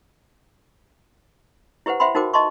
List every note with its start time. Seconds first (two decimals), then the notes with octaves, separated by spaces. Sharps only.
1.86 E4 G4 B4 C5 F#5
2.00 C5 E5 F#5 G5 B5 C6
2.15 D#4 F#4 A#4 C5 G5 D6
2.33 D#5 A5 C6 C#6